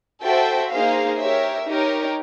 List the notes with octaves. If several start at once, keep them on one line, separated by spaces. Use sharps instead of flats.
F#4 A4 C5 E5 G5
A#3 D#4 G#4 C5 F5
G4 A#4 C#5 E5
D#4 G4 A#4 C#5